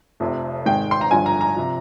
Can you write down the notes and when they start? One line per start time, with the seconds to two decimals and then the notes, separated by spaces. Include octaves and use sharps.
0.20 F1 F2 C3
0.65 G#1 G#2 D#3 G#3 G5
0.91 C6
1.01 A#5
1.11 G1 G2 F3 G#5
1.26 A#5
1.41 A#5
1.56 C3 F3